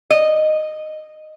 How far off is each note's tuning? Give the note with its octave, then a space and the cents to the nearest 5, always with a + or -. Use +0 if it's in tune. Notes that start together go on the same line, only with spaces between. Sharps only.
D#5 -5